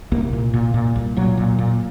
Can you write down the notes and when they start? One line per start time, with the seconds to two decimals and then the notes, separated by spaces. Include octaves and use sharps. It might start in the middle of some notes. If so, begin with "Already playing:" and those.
0.12 C2 A#3
0.33 A#2
0.53 A#2
0.74 A#2
0.95 C2
1.16 A#2 F#3
1.37 A#2
1.59 A#2